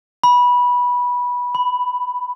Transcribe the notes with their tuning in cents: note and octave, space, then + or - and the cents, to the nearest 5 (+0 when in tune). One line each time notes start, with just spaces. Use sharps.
B5 -15
B5 +10